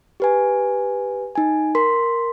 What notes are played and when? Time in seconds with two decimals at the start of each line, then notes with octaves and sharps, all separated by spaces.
0.20 G4 B4 G#5
1.35 D#4 G#5
1.75 A#4 C6 B6